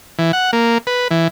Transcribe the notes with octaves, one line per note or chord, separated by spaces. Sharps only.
E3
F#5
A#3
B4
E3